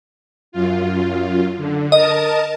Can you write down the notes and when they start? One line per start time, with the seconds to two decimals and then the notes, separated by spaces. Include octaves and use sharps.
0.52 F#2 F4
1.57 D3
1.92 A#4 D#5 A5